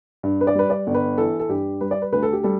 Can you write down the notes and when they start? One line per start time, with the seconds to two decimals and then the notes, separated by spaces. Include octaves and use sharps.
0.23 G2
0.41 B4
0.47 D5
0.55 G3 B4
0.70 D5
0.87 G1
0.94 B4
1.17 E3 A4
1.40 A4
1.49 G2 G4
1.81 G3 B4
1.91 D5
2.02 B4
2.12 D2 B4
2.23 A4
2.33 G4
2.44 G3 A4